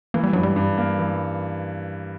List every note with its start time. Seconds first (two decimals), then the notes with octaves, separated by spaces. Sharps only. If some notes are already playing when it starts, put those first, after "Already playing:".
0.14 E3 A#3
0.24 G3
0.33 G2 F#3
0.43 G3
0.56 G2
0.78 A#3
0.99 E3